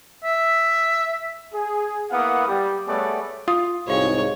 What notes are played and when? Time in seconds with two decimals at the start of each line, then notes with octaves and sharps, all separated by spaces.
0.24 E5
1.53 G#4
2.11 A#3 B3 E4 F5 F#5 D#6
2.46 G3
2.87 G3 A3 B3 G#4 C#5 D5
3.48 F4 D#6
3.88 C2 G#2 F#4 C#5 F5 G5